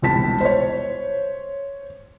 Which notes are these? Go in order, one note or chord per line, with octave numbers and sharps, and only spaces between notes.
E1 C2 A5 B6
C5 C#5